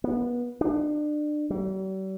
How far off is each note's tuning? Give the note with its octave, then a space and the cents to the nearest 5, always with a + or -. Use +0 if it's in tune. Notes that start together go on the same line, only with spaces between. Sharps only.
B3 -30
D4 +30
G3 -45